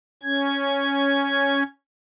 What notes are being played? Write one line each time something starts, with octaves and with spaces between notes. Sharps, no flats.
C#4 G#6